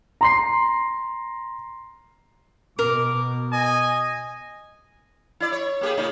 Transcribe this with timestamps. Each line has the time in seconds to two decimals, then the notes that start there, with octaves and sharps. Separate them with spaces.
0.21 A#5 C6 C7
2.79 B2 A#4 D6
3.53 D#5 G#5
5.40 E4 D5
5.52 C#5
5.81 A#3 G4 G#4
5.97 A2 C#3 D#4